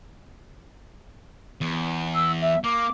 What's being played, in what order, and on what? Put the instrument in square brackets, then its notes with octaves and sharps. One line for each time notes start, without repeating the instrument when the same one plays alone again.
[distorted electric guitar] E2
[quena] E6
E5
[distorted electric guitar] A#3 [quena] D6